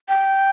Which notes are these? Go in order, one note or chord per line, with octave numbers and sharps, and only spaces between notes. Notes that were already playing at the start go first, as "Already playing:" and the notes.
G5